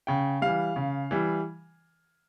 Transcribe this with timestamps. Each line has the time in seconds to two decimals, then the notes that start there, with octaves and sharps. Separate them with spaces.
0.07 C#3 G5
0.42 E3 G3 F5
0.76 C#3
1.11 E3 G3